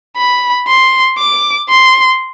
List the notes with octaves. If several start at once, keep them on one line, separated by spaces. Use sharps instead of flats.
B5
C6
D6
C6